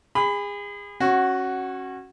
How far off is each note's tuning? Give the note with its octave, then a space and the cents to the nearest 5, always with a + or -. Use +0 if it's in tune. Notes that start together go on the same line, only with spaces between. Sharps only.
G#4 -30 B5 +15
C#4 -20 F#4 +5 F#5 +0